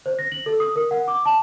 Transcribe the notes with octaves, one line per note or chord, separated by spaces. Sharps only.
C5
A#6
F#7
A4
D#6
A#4
F#5
D6
A5